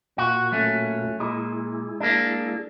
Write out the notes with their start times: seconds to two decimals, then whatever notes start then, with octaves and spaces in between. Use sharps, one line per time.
0.18 A#2 A#3 F4 F#4
0.52 F#3 A3 C#4
1.20 A#2 G#3 E4 G#4
2.00 A#3 D4